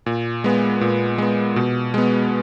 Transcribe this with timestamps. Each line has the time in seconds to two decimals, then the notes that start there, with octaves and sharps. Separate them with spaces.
0.06 A#2
0.44 G#3 B3
0.81 A#2
1.18 G#3 B3
1.56 B2
1.94 G#3 B3